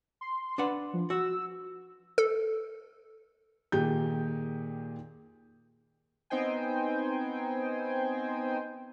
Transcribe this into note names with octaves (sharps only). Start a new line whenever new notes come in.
C6
D4 B4 F#5
F3
F#4 E6
A4
A#2 D#3 G4 G#4 G6
B3 C4 D#4 C5 G5 G#5